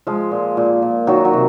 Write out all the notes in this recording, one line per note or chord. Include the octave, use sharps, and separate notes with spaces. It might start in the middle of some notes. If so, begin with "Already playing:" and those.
F3 G#3 F4
A#2
A#2
A#2
D#3 F#3 F#4
F#3 F#4
C3